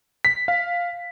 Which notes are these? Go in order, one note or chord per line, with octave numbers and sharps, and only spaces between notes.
B6
F5